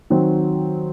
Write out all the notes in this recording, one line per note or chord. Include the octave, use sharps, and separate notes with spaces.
D#3 F#3 C4